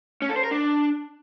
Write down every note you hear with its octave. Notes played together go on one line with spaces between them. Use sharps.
C#4
A4
C5
A#4
D4